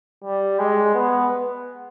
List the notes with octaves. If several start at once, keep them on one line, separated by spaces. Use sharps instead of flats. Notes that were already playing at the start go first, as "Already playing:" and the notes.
G3
G#3
B3